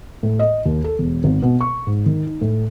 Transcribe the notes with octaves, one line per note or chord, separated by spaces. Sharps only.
A2
D#5
D#2
A4
E1
G#1
B2
C#6
G#2
D#3
D#4
A2